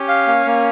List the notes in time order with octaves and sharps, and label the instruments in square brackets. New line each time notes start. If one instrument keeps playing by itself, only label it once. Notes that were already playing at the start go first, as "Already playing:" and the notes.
Already playing: [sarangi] C#4 [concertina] G4
[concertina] F5
A#3
A#3